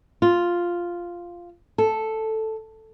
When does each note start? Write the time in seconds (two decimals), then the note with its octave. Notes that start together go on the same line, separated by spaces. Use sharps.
0.22 F4
1.78 A4